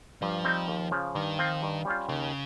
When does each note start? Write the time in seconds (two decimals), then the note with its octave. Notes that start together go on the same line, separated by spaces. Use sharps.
0.22 G2 F3
0.45 G3 C4 D#4
0.68 D#2
0.91 C#3 F3
1.15 G2 D#3
1.39 F3 C4 F4
1.63 G2
1.85 G3 C#4 F4
2.09 D#2 C#3